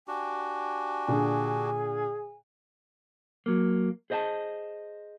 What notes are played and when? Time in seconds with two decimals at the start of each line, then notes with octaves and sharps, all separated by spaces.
0.08 D4 F#4 G4 G#5
1.08 A#2 D3 G#4
3.46 F#3 A#3
4.10 G#4 C5 D#5 G#5 A5